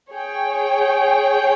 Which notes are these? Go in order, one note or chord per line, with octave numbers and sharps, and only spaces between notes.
G#4 C#5 G5